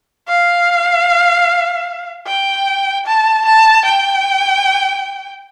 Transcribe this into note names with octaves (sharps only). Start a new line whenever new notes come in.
F5
G5
A5
A5
G5